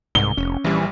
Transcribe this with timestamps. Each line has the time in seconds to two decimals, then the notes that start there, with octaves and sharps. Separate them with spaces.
0.15 C2 G#2 G7
0.37 F1 C#4
0.64 A#1 E3 G3